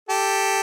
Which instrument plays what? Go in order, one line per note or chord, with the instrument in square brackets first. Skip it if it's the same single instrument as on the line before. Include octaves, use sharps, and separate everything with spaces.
[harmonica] G4 A4